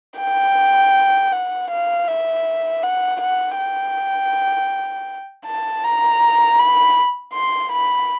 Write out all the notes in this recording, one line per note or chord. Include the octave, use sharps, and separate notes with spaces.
G5
F#5
F5
E5
F#5
F#5
G5
A5
A#5
B5
C6
B5